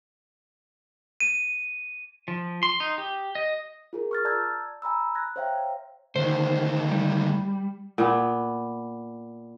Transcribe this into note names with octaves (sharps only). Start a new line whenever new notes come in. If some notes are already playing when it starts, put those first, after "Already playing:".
D#7
F3
C6
D#4
G4
D#5
F4 G#4 A#4
C#6 F6 A6
D5 A5 A#5 E6 G6 G#6
G#5 A#5 B5 E6
F#6 G#6 A#6
C5 C#5 E5 F5 G5 A#5
D2 D#3 C5
G3
A#2 B3